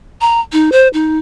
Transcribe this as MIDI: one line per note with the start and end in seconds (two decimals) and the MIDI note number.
0.21 0.41 82
0.53 0.70 63
0.72 0.88 72
0.93 1.18 63